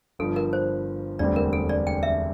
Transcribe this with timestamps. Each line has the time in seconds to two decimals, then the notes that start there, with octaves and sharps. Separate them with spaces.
0.19 G1 G2 F3 A4
0.36 A#4
0.53 C5
1.19 E1 D2 D3 G3 C4 D5
1.36 A#4
1.53 A4
1.69 D5
1.87 G5
2.03 E5